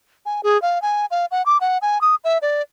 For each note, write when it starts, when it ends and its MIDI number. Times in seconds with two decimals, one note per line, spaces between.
0.26 0.41 80
0.43 0.60 68
0.62 0.81 77
0.82 1.06 80
1.11 1.26 77
1.31 1.45 78
1.46 1.58 86
1.61 1.78 78
1.82 2.01 80
2.01 2.15 87
2.24 2.38 76
2.42 2.62 74